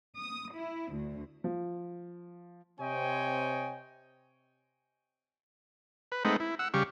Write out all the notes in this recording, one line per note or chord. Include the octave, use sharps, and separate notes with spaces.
D#6
E4
D2
F3
C3 C4 C#5 D#5 G5 G#5
B4
G#3 A3 C4 D#4 B4 F#5
E4
F#5 E6
C#3 G3 G4 F5 C#6